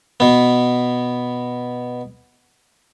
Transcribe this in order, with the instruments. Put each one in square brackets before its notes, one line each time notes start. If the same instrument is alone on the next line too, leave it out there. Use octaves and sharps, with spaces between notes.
[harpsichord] B2 B3